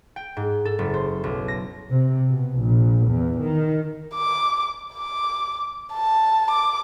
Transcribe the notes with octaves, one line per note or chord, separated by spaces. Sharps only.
G5
G#2
A4
F#1
C5
B1
A#6
C3
B2
A#1
E2
D#3
D6
D6
A5
D6